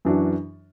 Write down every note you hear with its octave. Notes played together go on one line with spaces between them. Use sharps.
F#2 E3 D4 F#4